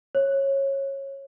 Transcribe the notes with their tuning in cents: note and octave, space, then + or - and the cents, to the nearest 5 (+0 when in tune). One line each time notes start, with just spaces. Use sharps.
C#5 -20